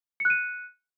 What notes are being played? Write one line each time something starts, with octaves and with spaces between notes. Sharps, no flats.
F#6 C#7 D#7